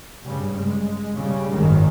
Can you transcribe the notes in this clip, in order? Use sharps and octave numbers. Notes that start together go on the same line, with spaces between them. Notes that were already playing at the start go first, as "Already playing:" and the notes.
G2 C#3 G3
G#3
C#3 G3
G#1 F#2 D#3 G#3